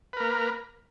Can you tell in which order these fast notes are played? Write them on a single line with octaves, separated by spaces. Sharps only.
B4 A#4 A#3